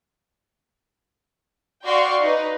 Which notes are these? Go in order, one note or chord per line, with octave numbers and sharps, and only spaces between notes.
F#4 D5 F5 G5 C6 C#6
D#4 B4